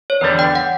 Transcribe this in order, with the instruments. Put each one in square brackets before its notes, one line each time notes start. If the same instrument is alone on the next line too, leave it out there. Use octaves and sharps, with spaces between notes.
[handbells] C#5
[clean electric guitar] E2 D3 G3 [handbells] B4
[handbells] G5
F#5